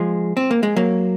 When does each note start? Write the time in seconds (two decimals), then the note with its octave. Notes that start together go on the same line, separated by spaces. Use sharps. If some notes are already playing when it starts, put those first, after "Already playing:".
Already playing: F3 G#3
0.37 C4
0.51 A#3
0.63 G#3
0.76 F#3 A#3